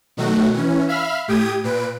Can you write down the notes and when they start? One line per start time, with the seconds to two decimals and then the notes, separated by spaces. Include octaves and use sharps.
0.17 B2 D#3 F#3 A3 F#4
0.54 E3 C#4
0.88 E5 F5 B5 E6 F6
1.28 A2 G4 G5 D#6 G#6 D#7
1.64 A#2 B4 D7